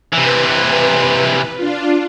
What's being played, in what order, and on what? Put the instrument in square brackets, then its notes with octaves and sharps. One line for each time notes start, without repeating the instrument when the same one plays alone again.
[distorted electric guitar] C3 E3 [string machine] B4
[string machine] D4 F4